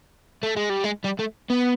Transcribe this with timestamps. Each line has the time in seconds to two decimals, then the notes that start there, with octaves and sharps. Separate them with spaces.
0.43 A3
0.56 G#3
0.69 G3
0.84 G#3
1.04 G3
1.19 A3
1.50 B3